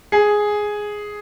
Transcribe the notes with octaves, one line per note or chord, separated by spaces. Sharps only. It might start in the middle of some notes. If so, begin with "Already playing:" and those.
G#4